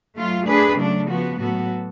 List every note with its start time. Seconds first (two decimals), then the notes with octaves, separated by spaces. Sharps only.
0.17 F#3 A3 F4
0.47 A3 D4 G#4 B4
0.78 C#3 F#3 A3 D4
1.08 F3 B3 F#4
1.39 A2 F#3 B3 F#4 A4